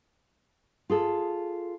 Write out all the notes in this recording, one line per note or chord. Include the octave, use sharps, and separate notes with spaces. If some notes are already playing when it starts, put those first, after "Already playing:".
F4 G#4 A4